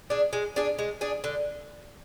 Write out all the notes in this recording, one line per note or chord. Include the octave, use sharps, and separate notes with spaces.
D4 G#4
G#3
D4 G#4
G#3
D4 G#4
D3